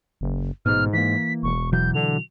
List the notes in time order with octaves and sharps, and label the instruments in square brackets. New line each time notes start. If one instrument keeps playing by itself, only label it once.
[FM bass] F#1
[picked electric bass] A1 B2 [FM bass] G#2 [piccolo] F6
[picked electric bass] E3 A#3 [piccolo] B6
[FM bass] E1 [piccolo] C#6
[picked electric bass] B2 E3 F#3 [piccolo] G6
[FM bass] D3 [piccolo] F7